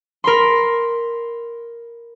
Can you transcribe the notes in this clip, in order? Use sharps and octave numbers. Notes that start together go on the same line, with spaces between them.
A#4 B5 C6